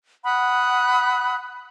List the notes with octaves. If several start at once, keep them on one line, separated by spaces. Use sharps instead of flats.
F#5 B5 D#6 F#6